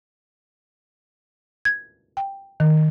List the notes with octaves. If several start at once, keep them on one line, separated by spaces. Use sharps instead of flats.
G#6
G5
D#3